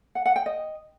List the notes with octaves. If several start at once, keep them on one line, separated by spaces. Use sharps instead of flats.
F#5
F#5
G5
D#5